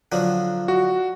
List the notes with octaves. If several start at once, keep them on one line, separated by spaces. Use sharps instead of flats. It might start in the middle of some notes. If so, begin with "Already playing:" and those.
D3 F3 F#3
F#4